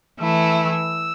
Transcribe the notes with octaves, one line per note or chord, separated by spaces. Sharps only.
E3 A3 E4 E6